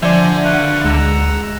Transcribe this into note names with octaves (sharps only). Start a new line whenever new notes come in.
D3 F3 C5 D5 E5 G#5
F#4 B4 F5 F#5
D2 G#3 F#5 A#5 E6